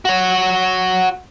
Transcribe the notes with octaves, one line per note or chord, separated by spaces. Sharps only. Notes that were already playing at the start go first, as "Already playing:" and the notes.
F#4 C#5